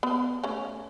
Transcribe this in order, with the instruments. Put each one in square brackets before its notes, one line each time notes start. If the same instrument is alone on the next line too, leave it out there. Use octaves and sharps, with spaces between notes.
[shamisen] B3
A3 C#4